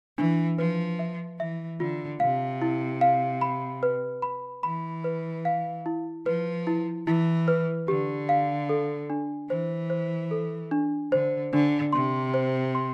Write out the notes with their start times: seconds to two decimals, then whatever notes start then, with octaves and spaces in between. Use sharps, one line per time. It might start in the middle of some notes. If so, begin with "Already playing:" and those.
0.18 E3 D4
0.58 F3 B4
0.99 E5
1.40 E3 E5
1.80 D3 F4
2.20 C3 F5
2.62 E4
3.01 F5
3.41 B5
3.83 B4
4.22 B5
4.63 E3 B5
5.04 B4
5.45 F5
5.86 E4
6.26 F3 B4
6.67 E4
7.06 E3 E4
7.48 B4
7.88 D3 G4
8.29 F5
8.69 A4
9.10 D4
9.50 E3 C5
9.90 C5
10.31 A4
10.71 D4
11.12 D3 C5
11.52 D3 D4
11.93 C3 C6
12.34 C5
12.75 C6